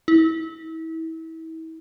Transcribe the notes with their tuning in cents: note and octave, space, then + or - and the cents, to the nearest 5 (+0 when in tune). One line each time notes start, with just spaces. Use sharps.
E4 -30